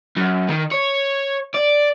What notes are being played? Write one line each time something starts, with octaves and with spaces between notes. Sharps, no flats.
F#2
D#3
C#5
D5